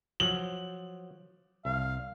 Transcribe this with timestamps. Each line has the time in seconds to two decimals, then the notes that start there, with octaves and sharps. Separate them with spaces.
0.20 F3 F#3 F#7
1.65 C2 F5